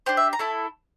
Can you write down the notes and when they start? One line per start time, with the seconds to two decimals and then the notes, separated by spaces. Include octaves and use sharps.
0.06 D4 G4 C5
0.17 E5
0.33 A#5
0.39 A3 E4 A4 A5